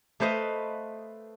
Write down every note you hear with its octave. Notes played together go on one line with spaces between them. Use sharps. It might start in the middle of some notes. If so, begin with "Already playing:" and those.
A3 B4 C5 D#5 F5